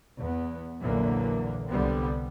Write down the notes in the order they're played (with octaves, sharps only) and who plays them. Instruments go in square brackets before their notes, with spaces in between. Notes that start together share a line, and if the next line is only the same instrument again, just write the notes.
[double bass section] E2 B3
A#1 E2 D3 E3 F#3 A#3
C2 D3 G3 B3 C4